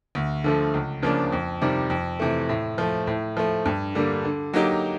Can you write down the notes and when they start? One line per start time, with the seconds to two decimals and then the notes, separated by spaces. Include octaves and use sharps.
0.15 D2
0.44 D3 F3 A3
0.74 C#2
1.02 C#3 F3 A#3 D4
1.32 F2
1.62 C3 D#3 G3
1.90 F2
2.19 C3 E3 A3
2.49 A2
2.78 F3 A3
3.07 A2
3.37 F3 A3
3.66 G2
3.95 D3 G3 A#3
4.25 D3
4.53 F#3 A#3 D#4 G4